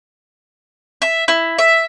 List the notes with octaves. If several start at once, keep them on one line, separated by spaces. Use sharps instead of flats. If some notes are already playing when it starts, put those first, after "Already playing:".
E5
E4
E5